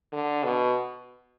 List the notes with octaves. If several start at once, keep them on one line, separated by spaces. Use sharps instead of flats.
D3
B2